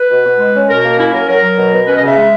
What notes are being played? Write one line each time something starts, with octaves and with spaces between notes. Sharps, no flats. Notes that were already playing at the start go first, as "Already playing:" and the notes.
Already playing: B4
B2
B2
G#3
C#4
B2 A#4
A#3
C#4 E4
F#3 A#4
F#3 A#4
F#3
B2
B2
C#4 B4
D#5
C#3 E5
G#3